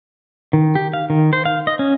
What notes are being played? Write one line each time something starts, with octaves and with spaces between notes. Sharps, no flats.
D#3
G4
F5
D#3
C5
F5
D#5
C#4